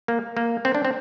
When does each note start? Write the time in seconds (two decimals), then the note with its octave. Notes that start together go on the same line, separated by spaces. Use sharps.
0.08 A#3
0.37 A#3
0.65 C4
0.75 D4
0.85 C4